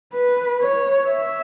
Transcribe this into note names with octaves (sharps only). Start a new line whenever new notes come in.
B4
C#5
E5